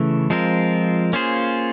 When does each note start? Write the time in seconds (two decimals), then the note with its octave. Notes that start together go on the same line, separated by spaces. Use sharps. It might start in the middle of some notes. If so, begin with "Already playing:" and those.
Already playing: C#3 E3 A3
0.30 F3 G#3 C4 F4 A#4
1.13 A#3 C#4 F4 G#4 C5